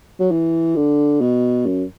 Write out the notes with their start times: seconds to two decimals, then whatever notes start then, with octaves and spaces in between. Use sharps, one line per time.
0.20 F#3
0.31 E3
0.76 D3
1.21 B2
1.66 F#2